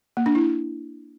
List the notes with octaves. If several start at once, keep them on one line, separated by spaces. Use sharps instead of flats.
A#3
D4
E4